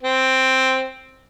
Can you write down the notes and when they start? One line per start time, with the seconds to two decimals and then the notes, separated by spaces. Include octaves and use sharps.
0.03 C4